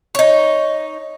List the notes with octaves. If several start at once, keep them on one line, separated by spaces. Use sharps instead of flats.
D#4 C#5